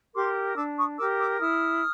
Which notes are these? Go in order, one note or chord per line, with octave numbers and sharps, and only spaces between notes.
G4 A#4 C6 D6
D4 D6 E6
C#6 D#6
G4 A#4 D6 E6
D6 E6
E4 D#6 F6